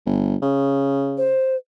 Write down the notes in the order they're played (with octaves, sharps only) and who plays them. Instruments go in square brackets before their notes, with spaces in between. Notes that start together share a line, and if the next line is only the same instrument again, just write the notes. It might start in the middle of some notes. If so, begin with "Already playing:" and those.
[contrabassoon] G1
C#3
[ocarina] C5